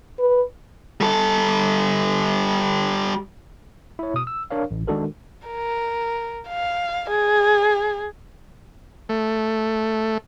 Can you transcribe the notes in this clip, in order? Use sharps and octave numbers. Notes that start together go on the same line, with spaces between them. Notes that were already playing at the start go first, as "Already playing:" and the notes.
B4
G3 A4
E4 C#5
B2 D#6
E6
D4 A#4 C#5 F5
A1
D#3 G#3 D4 F#4 A4 A#4
A#4
F5
G#4
A3